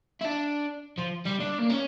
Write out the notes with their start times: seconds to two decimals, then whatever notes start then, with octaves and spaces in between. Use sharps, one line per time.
0.21 E4
0.25 D4
0.98 F3
1.26 G3
1.40 D4
1.59 A#3
1.69 C#4